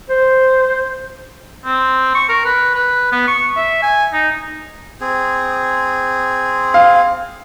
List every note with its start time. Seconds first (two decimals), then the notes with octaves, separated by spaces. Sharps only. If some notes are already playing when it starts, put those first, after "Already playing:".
0.10 C5
1.65 C4
2.15 C#6
2.29 A#4
2.45 B4
2.75 B4
3.12 B3
3.27 C#6
3.57 E5
3.82 G#5
4.13 D#4
5.01 C4 G#4
6.74 F5